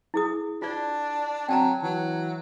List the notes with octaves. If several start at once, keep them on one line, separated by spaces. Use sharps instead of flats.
E4 G#4 D#6
D4 F4 D5
F#3 C4 G5 A5 A#5
E3 F#3